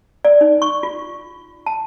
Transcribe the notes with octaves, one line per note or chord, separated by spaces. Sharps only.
D5
D#4
C#6
F4
A5